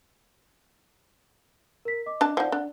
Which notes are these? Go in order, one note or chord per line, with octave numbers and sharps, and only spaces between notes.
A#4 B6
D#5 D6
D4 A5
F3 D#4 D5 F#5
D4